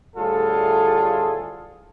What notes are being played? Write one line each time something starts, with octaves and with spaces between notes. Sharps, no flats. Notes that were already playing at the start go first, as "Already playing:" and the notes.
D2 A2 G3 F4 G#4 A4